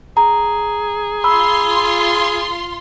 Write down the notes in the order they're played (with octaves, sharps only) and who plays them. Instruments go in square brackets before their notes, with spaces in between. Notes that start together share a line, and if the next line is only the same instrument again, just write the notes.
[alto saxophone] G#4 [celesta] A#5
[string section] F4 C6 [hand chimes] B5 E6